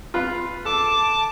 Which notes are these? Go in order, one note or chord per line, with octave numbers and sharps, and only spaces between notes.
F4 B4
A4 A5 D6